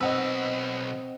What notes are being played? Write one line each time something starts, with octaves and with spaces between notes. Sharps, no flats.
B1 C4 B4 D#5 F#5 E6